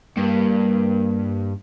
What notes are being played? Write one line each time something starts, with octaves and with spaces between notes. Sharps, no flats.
G2 A#3